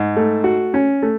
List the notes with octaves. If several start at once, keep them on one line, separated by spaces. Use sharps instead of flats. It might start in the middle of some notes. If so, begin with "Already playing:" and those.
Already playing: G#2
A3
F#4
C#4
A3